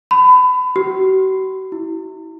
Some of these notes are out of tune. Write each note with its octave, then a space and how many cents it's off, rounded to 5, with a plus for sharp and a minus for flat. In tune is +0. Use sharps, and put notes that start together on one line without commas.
B5 +30
F#4 +45
E4 -15